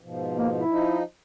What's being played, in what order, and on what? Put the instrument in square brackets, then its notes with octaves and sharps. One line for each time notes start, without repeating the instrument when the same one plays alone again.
[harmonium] G#2 B2 F3
[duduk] A#3
E4
[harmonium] F3 D#4